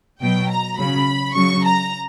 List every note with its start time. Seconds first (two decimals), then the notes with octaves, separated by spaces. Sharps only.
0.22 B2 F#3 G5
0.50 A#5
0.78 C#3 F#3 B5
1.35 C#3 F#3 C#6
1.64 A#5